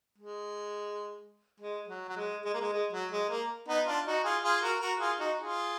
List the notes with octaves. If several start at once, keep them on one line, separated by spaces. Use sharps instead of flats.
G#3
G#3
F#3
F#3
G#3
G#3
A#3
G#3
G#3
F#3
G#3
A#3
B3 D#4
D4 F4
D#4 F#4
F4 G#4
F4 G#4
F#4 A#4
F#4 A#4
F4 G#4
D#4 F#4
F4 G#4